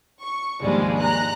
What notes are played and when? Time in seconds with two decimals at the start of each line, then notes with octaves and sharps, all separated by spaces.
0.23 C#6
0.62 D#2 G#2 F3 G3 G#3 D4
1.02 A#5 F#6